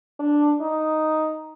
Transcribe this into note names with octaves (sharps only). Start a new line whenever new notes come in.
D4
D#4